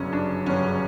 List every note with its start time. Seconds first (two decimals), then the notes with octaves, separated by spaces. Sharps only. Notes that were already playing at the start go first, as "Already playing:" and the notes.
Already playing: G1 F#2 C#3 C#4
0.12 D4
0.46 G1 F#2 C#3 C#4